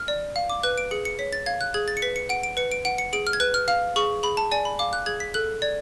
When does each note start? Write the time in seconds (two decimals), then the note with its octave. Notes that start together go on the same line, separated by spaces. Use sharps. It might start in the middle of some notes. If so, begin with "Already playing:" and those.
Already playing: F6
0.08 D5
0.36 F5
0.50 D6
0.63 B4 F#6
0.78 D7
0.91 G#4 C#7
1.05 C#7
1.19 C#5 B6
1.33 A6
1.46 F5 G#6
1.61 F#6
1.74 G#4 G#6
1.88 A6
1.97 C#7
2.02 B4 B6
2.16 C#7
2.29 F#5 D7
2.43 D7
2.57 B4 C#7
2.72 D7
2.85 F#5 D7
2.98 C#7
3.13 G#4 D7
3.27 F6
3.33 G#6
3.40 B4 F#6
3.54 F6
3.68 F5 F6
3.96 G#4 C#6
4.23 G#4 B5
4.37 A5
4.51 D5 G#5
4.65 B5
4.79 F5 D6
4.93 F#6
5.06 G#4 G#6
5.20 B6
5.34 A4 F#6
5.62 D5 G#6